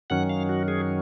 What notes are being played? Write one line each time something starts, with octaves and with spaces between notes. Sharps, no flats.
F#2 D#3 F#3 C#4 F#5
F5
F#4
G#4